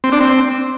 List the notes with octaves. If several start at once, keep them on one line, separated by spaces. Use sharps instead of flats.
C4
D4
C4